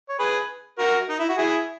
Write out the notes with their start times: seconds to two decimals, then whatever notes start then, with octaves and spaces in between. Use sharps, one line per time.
0.09 C#5
0.19 G#4 B4
0.79 F#4 A#4
1.10 D#4
1.19 E4
1.29 F#4
1.38 E4 G#4